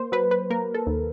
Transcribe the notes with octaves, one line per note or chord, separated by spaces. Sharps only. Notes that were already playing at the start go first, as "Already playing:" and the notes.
Already playing: A#3 C5
F#3 B4
B4
A#3 A#4
A4
D#2